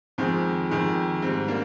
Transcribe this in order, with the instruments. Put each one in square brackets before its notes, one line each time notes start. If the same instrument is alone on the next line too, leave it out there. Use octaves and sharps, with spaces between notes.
[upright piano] F2 D#3 G#3 C4
F2 D#3 G#3
G#2 G3 C4
A#3 D4